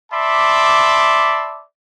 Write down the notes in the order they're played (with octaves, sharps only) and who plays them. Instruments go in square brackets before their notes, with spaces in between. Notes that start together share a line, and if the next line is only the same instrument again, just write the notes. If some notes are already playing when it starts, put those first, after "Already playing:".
[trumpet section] D5 E5 A5 B5 C6 D6